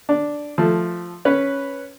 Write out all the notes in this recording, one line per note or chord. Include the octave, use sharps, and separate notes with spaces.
D4
F3 A3
C#4 B4